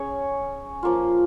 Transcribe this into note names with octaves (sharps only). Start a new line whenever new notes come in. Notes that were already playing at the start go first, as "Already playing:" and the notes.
Already playing: C#4 G#4 C#5
F3 A#3 F4